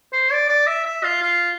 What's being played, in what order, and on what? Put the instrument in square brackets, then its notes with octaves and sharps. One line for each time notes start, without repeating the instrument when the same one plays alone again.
[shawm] C5
D5
D5
E5
E5
F4
F4